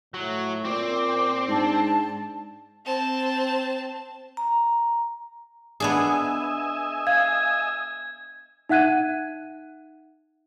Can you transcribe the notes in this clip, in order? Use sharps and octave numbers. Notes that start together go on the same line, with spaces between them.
A2 F#3
A#2 C4 D6
G#2 D4 A5
C4 A5
A#5
B3 D4 G#4 D#5 E5 G#5
F5 G#6
D#4 E5 F#5 F#6 G#6 D#7